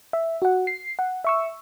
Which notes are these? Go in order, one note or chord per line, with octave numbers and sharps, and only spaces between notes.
E5
F#4 F#5
C7
F#5
E5 C#6 E6